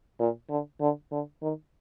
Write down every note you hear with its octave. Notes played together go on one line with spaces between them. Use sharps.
A#2
D3
D3
D3
D#3